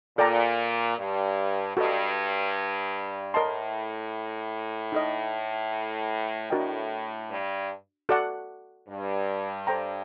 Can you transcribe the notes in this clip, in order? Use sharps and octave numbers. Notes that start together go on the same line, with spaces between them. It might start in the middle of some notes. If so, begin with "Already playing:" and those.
A#2 A4 D5 G5 A#5
G2
G2 F#4 A4 D#5
A2 A#4 D#5 A5 C6
D#4 A4 D#5
A2 D4 F#4 A#4 D#5 G5
G2
F#4 A4 D5 F#5
G2
A4 C5 G5 A#5